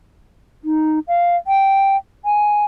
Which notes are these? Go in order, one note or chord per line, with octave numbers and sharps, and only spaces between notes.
D#4
F5
G5
G#5